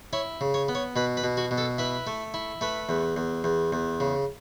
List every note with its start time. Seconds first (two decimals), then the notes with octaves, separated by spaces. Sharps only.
0.13 E4 C#5
0.41 C#3
0.54 C#5
0.68 B3
0.75 C#5
0.96 B2 B4
1.17 B4
1.24 B2
1.37 F#4
1.51 B2
1.58 A4
1.78 E4 B4
2.07 A3
2.34 E4
2.61 A3 B4
2.89 E2
3.16 E2
3.44 E2
3.72 E2
4.00 C#3